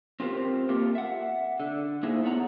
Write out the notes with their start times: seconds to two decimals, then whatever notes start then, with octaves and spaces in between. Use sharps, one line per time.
0.20 C4 F4 G4 A#4 C5
0.69 A3 A#3 F4 G4 A#4
0.95 E5 F#5
1.60 D3
2.03 A#3 D#4 E4 G#4 C5 E5
2.23 A3 B3 C#5 F#5 G#5 A#5